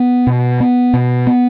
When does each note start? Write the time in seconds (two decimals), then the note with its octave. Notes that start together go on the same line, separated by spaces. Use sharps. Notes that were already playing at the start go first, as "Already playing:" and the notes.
Already playing: B3
0.27 B2
0.60 B3
0.93 B2
1.27 B3